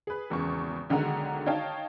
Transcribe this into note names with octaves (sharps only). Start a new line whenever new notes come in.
G#4 B4
G#1 E2 C#3 C#6
B1 D3 D#3 G#3 F#5 A#5
D#4 C#5 F5 G5 A5